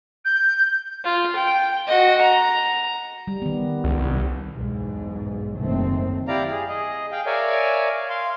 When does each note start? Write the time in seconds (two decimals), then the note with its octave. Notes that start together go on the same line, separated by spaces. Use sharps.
0.24 G6
1.04 F4
1.36 G5
1.87 F#4 D#5
2.21 A#5
3.27 G3
3.42 D#3 B3
3.84 C#2
3.97 C2
4.53 B1 E2 G#2 B2
5.59 F#1 D#3 A3 C4
6.27 E4 G4 D5 F5 A#5
6.51 G#4
6.68 G#4 D#5
7.12 G#4 F5 G5
7.26 A#4 C#5 D5 E5 F5 G#5
8.09 F5 C6